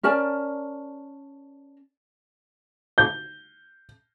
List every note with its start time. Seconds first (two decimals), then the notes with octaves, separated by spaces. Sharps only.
0.03 C#4 A#4 D5 A5
2.98 G6